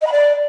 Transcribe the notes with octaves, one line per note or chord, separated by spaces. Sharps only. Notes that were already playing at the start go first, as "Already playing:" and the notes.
D#5
B5
D5